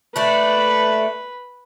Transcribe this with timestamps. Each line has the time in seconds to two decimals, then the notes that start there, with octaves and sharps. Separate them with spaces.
0.16 A3 D4 B4